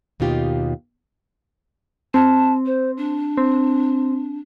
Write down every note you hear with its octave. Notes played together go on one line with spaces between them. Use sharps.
D#2 B2 D#4 F4 G4
C4 A5
C5
D4
C4